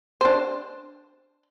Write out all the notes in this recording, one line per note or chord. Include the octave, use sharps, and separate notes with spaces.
D4 C5